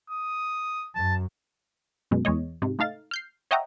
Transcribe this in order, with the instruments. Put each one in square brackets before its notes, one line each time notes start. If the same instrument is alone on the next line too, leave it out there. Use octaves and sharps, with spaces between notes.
[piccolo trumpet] D#6
[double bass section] F#2 [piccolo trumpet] A5
[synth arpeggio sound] F#2 B2 G#3
E2 G#3 C#5 D#5
G#2 C3
A3 D#4 F5 A6
F6 G6 C7
C#5 D#5 E5 F#5 G5 A#5